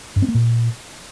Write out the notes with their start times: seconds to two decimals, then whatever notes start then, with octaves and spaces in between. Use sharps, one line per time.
0.16 G2
0.22 C4
0.28 A#3
0.35 A#2